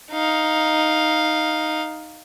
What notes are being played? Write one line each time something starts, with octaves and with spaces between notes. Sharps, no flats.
D#4 F5